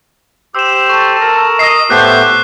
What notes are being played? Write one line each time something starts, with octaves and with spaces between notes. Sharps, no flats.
G4 C5 E6 E7
A4 C#6
A#4 A#5
D#5 C7
A2 A3 B3 G4 C5 F#6 G6 C7